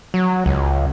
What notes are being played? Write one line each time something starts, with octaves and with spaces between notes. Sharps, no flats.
F#3
C#2